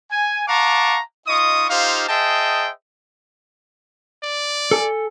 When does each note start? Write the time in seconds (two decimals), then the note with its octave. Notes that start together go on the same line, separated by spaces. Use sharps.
0.11 G#5
0.48 F5 F#5 A5 A#5 C#6 D6
1.27 D#4 F4 D#5 C#6 D#6
1.69 D#4 F4 G4 C5 F5
2.09 G#4 C5 D#5 E5 G5 A5
4.23 D5
4.71 A4 G#5